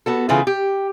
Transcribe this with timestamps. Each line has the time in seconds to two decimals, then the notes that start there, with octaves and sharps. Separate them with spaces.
0.06 B3 F#4 A4
0.29 C#3 E3 A3 B3 F4 G#4
0.47 G4